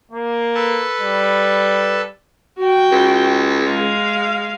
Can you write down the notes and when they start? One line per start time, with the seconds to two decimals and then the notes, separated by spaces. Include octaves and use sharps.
0.12 A#3
0.55 A4 B4 A5
1.01 G3
2.59 F#4 G5
2.92 C#2
3.65 G#3 F5